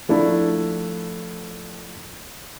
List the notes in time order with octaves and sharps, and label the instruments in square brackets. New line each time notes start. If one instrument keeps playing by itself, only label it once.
[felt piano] F3 A3 D4 E4